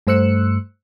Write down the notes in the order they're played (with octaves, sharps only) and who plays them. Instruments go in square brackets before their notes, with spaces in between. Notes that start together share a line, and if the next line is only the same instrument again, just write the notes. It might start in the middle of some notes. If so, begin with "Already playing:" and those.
[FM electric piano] G2 A3 C5 E6 F#6 C#7